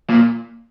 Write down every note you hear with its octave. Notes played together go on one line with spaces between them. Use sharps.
A#2